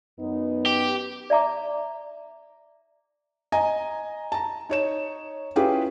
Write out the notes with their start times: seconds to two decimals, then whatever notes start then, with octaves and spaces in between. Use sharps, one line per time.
0.20 F#2 B3 D#4
0.66 G4
1.30 D5 E5 A#5 D6
3.52 D#5 G#5 A#5
4.32 A5 A#5
4.69 D#4 C#5 E7
5.56 C#4 E4 F4 G4 G#4 B4